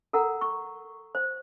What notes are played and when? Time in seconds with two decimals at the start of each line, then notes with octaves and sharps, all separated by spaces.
0.13 A4 A#4 F#5 A#5
0.41 C#6
1.15 C5